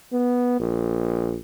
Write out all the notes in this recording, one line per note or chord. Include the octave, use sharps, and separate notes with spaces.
B3
A#1